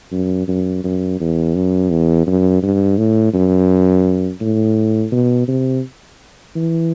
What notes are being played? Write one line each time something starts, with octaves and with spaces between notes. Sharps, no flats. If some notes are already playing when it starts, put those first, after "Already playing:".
F#2
F#2
F#2
E2
F#2
E2
F#2
G2
A2
F#2
A2
B2
C3
E3